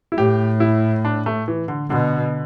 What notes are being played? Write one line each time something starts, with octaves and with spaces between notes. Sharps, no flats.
E4
A2 G4
E4
D4
A3
E3
D3
B2 D3